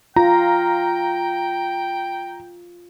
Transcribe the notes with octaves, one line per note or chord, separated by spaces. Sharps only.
F4 G5 A#5